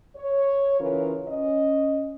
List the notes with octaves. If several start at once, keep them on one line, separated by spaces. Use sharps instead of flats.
C#5
C#3 E3 C#4 F4 A#4 B4
C#4 D#5